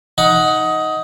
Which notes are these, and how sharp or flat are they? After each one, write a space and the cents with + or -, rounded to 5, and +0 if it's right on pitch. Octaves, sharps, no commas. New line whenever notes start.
D#4 +15 F#5 +0